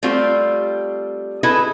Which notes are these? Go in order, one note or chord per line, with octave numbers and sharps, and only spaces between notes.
G3 A3 C4 F4 G4
E4 G#4 A4 B4 D#5